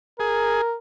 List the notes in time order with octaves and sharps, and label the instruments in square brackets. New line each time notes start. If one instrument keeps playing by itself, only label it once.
[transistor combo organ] G#4 [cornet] A#4